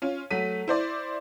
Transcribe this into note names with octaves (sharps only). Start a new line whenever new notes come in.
C#4 F4
F#3 A3 B6 D#7
E4 C5 D5